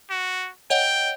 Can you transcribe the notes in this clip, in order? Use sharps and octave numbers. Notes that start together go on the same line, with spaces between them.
F#4
C#5 D#5 F#5 G5